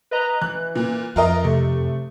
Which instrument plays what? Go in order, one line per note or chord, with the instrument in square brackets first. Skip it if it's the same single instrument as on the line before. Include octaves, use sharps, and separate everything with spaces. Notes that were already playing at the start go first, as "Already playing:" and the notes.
[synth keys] B4 D#5 A#5
[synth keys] E3 [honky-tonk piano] F#6
[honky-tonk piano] A#2
[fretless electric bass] F2 [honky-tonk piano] F4 A#4 D#5
[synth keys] C3 [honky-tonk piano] A3